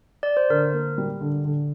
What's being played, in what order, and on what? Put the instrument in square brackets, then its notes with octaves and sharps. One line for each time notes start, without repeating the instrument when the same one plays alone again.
[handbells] D5
C5
[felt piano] D3 [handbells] A#4
[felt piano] A#3
G3
D3
D3